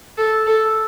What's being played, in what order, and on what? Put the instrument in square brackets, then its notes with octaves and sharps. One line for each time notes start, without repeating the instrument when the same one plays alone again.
[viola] A4
A4